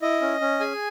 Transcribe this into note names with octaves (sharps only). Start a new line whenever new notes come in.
E4 D#5
C#4
C#4
G#4 G#5